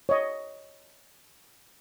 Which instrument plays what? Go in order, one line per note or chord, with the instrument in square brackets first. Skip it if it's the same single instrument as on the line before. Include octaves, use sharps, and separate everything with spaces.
[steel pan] C#5 D#5